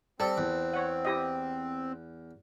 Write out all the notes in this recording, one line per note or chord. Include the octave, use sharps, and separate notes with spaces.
G3 C4 A4
E2
C#5 F#5
E4 G4 D#5